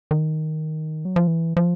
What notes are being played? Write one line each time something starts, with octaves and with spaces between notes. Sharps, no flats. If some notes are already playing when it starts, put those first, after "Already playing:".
D#3
F#3
F3
E3
F3